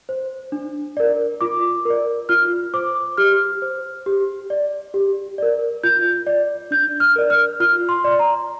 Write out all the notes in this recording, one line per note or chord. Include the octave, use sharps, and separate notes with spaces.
C5
D4
A#4 D5
F4 D6
A#4 D5
F4 F6
C5 D6
G4 F6
C5
G4
D5
G4
A#4 D5
F4 G6
D5
D4 G6
F6
A#4 D5
F6
F4 F6
C6
D5
A#5